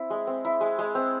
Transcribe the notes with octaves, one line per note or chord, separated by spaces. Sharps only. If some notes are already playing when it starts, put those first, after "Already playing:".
Already playing: C4 E4
G#3
C4
E4
G#3
G#3
C4